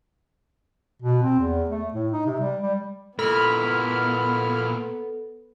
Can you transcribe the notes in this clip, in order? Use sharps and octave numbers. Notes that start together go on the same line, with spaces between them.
B2
C4
E2
A3
A2
D#4
C3
G3
G3
A#2 B3 E4 A4 B5 F6